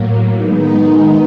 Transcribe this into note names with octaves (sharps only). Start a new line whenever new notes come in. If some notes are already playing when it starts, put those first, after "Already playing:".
Already playing: A2 F#3 A#3
D#3 G#3 B3 D#4